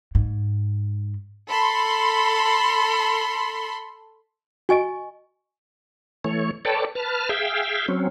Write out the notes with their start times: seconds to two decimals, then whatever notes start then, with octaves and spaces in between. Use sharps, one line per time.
0.15 G#2
1.50 A4 B5 C6
4.69 F#4 D#5 G#5 C#6 D7
6.24 E3 A3 C#5
6.65 A4 B4 C#5 D5 G5 A5
6.95 B4 A5 F6
7.29 G#4 E5 F5 G5
7.88 F#3 C4 C#4